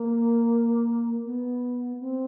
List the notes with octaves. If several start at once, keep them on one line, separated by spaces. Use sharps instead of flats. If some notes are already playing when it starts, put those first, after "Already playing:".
Already playing: A#3
B3
C4